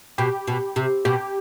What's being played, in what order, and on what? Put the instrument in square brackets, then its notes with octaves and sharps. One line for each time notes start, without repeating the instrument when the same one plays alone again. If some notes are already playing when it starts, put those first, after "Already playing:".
[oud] B2 [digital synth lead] G4
[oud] B2
C3
[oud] B2 [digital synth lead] G4